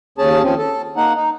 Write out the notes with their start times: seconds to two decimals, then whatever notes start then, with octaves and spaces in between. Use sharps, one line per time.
0.18 D#2 C#4 G#4 A5
0.44 F3 C4 C#4
0.58 A4
0.97 A#3 D#4 F#5
1.15 D#4